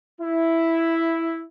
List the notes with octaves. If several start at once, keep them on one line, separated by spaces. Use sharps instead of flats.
E4